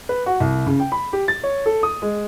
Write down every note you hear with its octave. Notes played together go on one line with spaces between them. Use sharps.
B4
F#4
C2
C#3
G5
B5
G4
A6
C#5
A4
D#6
G#3